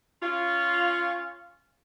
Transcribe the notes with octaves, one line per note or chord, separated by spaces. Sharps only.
C#4 F4